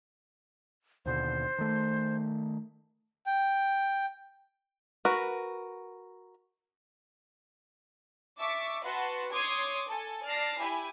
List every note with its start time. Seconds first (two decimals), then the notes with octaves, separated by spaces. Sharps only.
1.06 D#2 B2 D3 C5
1.58 D#3 A3
3.26 G5
5.05 F#4 A#4 B4
8.39 E5 A5 C#6 D6
8.83 F#4 B4 F#5 A5 C6
9.32 C#5 C6 D6 D#6 G#6
9.88 A4 G#5
10.26 D5 A5 F6 A#6 C7
10.59 E4 G4 G#5 B5